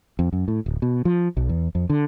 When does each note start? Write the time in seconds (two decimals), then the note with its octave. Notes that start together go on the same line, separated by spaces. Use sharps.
0.19 F2
0.33 F#2
0.48 A2
0.66 D1
0.82 B2
1.05 F3
1.37 B1
1.49 E2
1.75 F2
1.90 D3